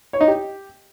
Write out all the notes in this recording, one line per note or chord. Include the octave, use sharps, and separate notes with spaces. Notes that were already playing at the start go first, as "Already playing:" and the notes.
C#5
D#4
G4